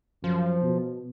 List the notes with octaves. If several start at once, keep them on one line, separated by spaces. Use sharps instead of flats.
F#2 F3
B2